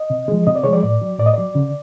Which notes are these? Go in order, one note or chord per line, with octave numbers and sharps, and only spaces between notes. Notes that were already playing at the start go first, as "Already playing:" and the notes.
Already playing: D#5
C3
F3 G#3
C3 D#5
D5
F3 G#3 C#5
D5
A2 D5
F#3
A2 D5
D#5
F#3 D5
C#3